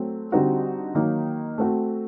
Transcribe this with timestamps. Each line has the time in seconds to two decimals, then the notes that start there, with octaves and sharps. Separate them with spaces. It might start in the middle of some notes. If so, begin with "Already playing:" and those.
Already playing: F#3 A3 C4
0.32 D3 G3 C4 D#4 F#4
0.95 D#3 F#3 A#3 D#4
1.58 A3 C4 F#4